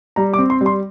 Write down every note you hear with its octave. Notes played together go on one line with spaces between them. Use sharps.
G3 A#5
D6
C4
C6
G3
C6